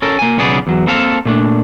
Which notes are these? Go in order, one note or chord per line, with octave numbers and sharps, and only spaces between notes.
C#4 A4 A#4
A#3 G#5
B1 C#3 B3 G#4 D5
E2 F#3
A#3 C4 A4 F5 A5
A#2 A3 D4